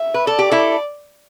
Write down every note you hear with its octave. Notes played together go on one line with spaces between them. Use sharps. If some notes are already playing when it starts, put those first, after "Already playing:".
Already playing: E5
B4
A4 D5
G4
E4 A4